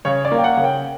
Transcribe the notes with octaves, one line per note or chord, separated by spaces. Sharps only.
C#3 C#5
D5
A#3
G5
F#5
C#3
G5